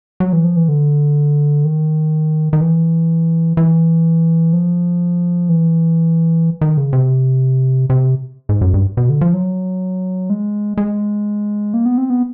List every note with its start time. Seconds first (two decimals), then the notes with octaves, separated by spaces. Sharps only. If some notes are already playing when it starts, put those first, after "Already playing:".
0.20 F#3
0.33 E3
0.44 F3
0.57 E3
0.68 D3
1.65 D#3
2.53 D#3
2.61 E3
3.57 E3
4.53 F3
5.49 E3
6.61 D#3
6.77 C#3
6.93 C3
7.90 C3
8.49 G#2
8.61 F#2
8.74 G2
8.97 B2
9.09 D3
9.21 F3
9.34 F#3
10.30 G#3
10.78 G#3
11.74 A#3
11.86 B3
11.98 C4
12.10 B3